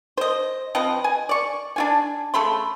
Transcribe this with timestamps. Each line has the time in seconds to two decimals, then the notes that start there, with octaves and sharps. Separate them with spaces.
0.17 C5 D#5
0.75 F3 C4 B4 D#5
1.04 G#5
1.29 D5 C#6
1.76 D4 F4 G#5
2.34 C#3 A3 B5 C6